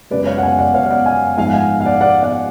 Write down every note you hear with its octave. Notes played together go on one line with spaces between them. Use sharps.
F#2 C#3 G#3 B4 D5
C#5 F5
F#5
F5 G#5
D5 F#5
C#5 F5
F5
D5 F#5
F5 G#5
G#2 F3 G#3 F5 G#5
F#5
F5 G#5
F5
D5 F#5
D5 F#5
D5 F#5